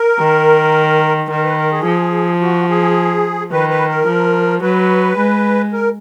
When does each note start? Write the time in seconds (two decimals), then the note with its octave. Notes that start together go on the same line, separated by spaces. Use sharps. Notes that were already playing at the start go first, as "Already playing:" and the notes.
Already playing: A#4
0.19 D#3
1.29 D#3 A#4
1.44 B4
1.58 A#4
1.71 G#4
1.85 F3
2.41 F#4
2.69 G#4
3.52 D#3 B4
3.70 B4
3.89 A#4
4.07 F3
4.62 F#3 B4
5.17 G#3
5.73 A#4